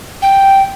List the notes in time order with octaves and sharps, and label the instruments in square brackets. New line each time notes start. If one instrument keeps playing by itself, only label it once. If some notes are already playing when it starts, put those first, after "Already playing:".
[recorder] G5